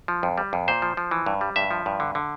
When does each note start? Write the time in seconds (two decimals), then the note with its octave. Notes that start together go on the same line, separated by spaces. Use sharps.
0.08 F3
0.23 F2
0.38 G3
0.53 F2
0.68 A#2 C5
0.82 F3
0.97 F3
1.11 E3
1.26 G2
1.41 G3
1.56 G2 E5
1.71 F3
1.86 G2
2.00 D3
2.15 D3